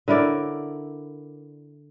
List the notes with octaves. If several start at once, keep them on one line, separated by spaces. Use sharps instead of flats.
D3 E4 A#4 D5